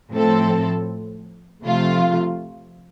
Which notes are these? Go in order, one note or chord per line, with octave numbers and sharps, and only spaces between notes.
A2 F3 C4 A4
C3 F3 A3 F4